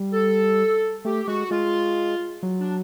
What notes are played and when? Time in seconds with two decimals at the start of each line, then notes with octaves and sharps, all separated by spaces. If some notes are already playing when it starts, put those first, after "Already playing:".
Already playing: G3
0.12 A4
1.05 A3 G4
1.28 G#3 F#4
1.51 G#3 F4
2.43 F#3
2.60 D4